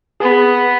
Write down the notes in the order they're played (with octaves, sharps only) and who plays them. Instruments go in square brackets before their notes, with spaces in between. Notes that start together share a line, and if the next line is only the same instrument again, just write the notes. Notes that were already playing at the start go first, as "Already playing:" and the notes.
[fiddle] B3 [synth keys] G#4